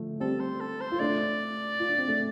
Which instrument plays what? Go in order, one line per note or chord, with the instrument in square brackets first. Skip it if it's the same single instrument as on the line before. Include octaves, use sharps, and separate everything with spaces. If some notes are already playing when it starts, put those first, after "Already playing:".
Already playing: [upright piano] D3 F3 A3
[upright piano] G3 C4 [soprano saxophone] A4
[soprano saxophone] C5
A4
C5
[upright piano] F4
[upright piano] A3 D4 [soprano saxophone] D5
[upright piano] F4
D4
C4
A3 D4